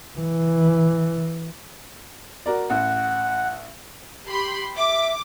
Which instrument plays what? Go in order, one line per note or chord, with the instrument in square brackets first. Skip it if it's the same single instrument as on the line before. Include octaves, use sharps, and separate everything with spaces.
[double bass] E3
[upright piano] F#4 A#4 D5
[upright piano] A1 [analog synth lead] F#5
[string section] G4 B5 C6
[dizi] E5 [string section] D6